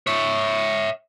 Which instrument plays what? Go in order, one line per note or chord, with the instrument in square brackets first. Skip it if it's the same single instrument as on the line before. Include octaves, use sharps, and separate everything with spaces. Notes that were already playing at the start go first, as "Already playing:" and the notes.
[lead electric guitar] C#5 E5